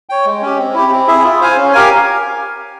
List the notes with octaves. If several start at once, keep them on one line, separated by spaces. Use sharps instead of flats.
C#5 G5
G#3
C#4 G4
C4
E4 G4
C4
E4 G#4 E5
F4
C5 F5 G#5
C#4
G4 A#4 F5 G#5